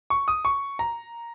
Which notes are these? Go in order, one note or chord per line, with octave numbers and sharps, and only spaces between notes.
C#6
D#6
C#6
A#5